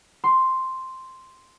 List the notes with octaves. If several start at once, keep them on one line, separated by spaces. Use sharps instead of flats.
C6